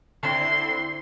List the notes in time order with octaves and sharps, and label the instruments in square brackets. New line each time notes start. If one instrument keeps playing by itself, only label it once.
[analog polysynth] D3 C4 E4 [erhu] C6